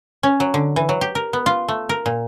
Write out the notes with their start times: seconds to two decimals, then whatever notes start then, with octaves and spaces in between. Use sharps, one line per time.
0.23 C#4
0.40 F#3
0.54 D3
0.76 E3
0.89 F#3
1.01 G4
1.15 A#4
1.33 B3
1.46 F4
1.68 A3
1.89 A#4
2.06 A#2